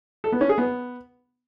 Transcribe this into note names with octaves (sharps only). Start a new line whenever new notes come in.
A4
B3
C#4
G#4
B3